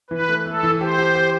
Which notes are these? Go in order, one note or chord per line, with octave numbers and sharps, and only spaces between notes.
E3 B4
A3
A3 A4
E3
G4 C5
G4
G4